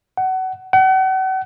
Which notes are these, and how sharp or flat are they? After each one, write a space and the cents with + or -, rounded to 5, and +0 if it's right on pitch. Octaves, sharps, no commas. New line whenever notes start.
F#5 +25
F#5 +40